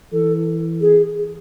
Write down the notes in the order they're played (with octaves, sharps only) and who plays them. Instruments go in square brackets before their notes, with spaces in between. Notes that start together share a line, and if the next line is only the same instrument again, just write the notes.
[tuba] E3 [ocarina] A4
[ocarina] G#4